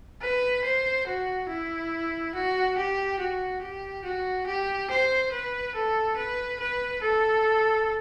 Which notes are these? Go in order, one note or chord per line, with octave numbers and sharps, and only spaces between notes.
B4
C5
F#4
E4
F#4
G4
F#4
G4
F#4
G4
C5
B4
A4
B4
B4
A4